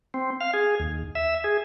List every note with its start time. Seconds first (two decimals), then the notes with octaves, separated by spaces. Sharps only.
0.14 C4
0.41 F5
0.54 G#4
0.80 D#2
1.15 E5
1.44 G#4